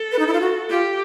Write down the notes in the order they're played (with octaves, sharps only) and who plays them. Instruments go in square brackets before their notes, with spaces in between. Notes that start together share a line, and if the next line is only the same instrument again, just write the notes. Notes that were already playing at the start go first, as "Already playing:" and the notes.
Already playing: [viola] A4
[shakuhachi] B4
D#4
E4
F4
F#4
[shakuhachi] F4 [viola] G4